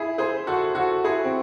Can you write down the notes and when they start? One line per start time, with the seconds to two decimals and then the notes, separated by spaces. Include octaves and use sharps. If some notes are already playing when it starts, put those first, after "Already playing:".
Already playing: E4 G#4
0.18 G#4 C5
0.47 F#4 A4
0.75 F#4 A4
1.04 E4 G#4
1.24 C4